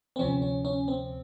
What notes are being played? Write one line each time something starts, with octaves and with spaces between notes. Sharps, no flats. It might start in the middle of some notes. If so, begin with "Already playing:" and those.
C4
D2 C3 F3 C#4
C#4
C#4
C4